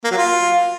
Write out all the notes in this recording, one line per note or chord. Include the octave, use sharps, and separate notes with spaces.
A#3
F#3
F4